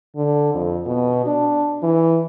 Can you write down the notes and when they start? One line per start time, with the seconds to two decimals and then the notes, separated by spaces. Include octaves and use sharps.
0.16 D3
0.55 F2
0.87 B2
1.26 D4
1.83 E3